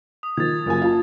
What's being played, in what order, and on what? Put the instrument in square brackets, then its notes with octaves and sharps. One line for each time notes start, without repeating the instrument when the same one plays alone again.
[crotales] D#6
[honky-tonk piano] D#3 F3 [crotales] G#6 A6
[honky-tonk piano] F#1 F4 G#5
F4 A5